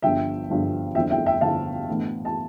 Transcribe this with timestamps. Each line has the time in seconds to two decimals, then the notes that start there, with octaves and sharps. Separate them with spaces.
0.02 G1 G2 D3 F3 E5 G5
0.50 G1 G2 D3 F3
0.95 G1 F2 D3 E5 G5
1.11 E5 G5
1.26 E5 G5
1.41 G1 F2 D3 F5 A5
1.88 A2 E3 B3 D4
2.25 A5